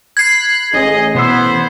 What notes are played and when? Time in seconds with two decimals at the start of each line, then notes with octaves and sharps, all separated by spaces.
0.17 B5 F#6 G#6 C7
0.73 A1 G#4 D#5
1.15 B2 B3 C5 C6 E6